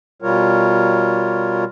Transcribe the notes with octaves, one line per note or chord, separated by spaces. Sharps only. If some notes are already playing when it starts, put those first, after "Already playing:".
B2 G3 F4 A#4 C#5